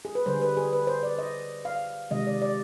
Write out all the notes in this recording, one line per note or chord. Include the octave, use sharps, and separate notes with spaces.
G#4
B4
D3 G3 C5
G#4
B4
G#4
B4
C5
D5
D#5
F5
C3 D#3 G#3 D#5
D5
D5